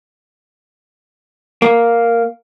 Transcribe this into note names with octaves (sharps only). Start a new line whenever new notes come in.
A#3